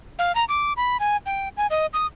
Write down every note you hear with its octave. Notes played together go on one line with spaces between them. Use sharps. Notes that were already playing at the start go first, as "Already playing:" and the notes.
F5
A#5
D6
B5
G#5
G5
G#5
D#5
D#6